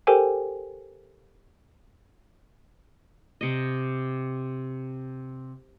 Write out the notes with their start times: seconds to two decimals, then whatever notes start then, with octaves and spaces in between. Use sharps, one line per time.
0.07 G4 A4 A#4 C5 G5 G#5
3.41 C3 D#5